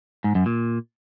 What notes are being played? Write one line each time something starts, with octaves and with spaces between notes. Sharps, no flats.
G#2
F#2
A#2